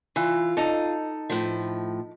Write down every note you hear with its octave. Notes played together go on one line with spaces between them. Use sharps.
E3 F4
D#4 A4
A2 F3